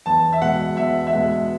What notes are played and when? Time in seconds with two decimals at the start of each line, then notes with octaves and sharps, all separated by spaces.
0.06 E2 A5
0.33 E5
0.42 B2 G#3 F#5
0.77 E2 E5
1.07 E5
1.13 B2 G#3 F#5